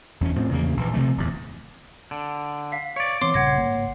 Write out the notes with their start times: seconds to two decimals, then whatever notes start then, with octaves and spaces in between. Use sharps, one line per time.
0.21 E2 C4 C#4
0.36 A2 F3 C4
0.52 E2 C#3 A#3
0.77 A#1 E3
0.93 C3 E3 F3 A3
1.17 D1 E2
2.11 D3
2.72 F5 B6
2.96 C#5 D5 C#7
3.21 E3 B3 C4 C#5 C6 D6
3.34 A#1 G2 C#3 F#5 G#6 A#6
3.56 G#1 A#3